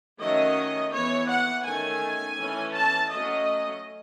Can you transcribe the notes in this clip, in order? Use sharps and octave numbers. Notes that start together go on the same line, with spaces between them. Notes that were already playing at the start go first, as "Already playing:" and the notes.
D#3 F#3 A3 C#4 D#5
E3 B3 C#5
F#5
D#3 A3 C#4 G#5
E3 A3 C#4
A5
F#3 A3 C#4 D#5